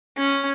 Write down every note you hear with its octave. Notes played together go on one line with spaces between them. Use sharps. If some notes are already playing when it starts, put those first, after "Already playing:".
C#4